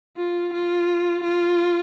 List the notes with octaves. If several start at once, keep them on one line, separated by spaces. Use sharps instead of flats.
F4
F4
F4